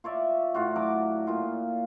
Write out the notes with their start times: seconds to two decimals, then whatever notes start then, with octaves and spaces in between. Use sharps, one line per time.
0.04 F4 C#5 D5 E5
0.54 A2 F4 F#4
0.76 F#3 D5 D6
1.27 A#2 F4